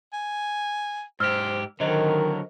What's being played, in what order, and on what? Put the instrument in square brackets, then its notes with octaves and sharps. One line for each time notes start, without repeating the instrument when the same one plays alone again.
[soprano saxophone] G#5
[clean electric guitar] G#2 G4 [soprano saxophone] C5 [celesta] E6 F6
[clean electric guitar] D3 F#3 [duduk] D#3 [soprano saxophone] A#4 [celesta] C5 D#5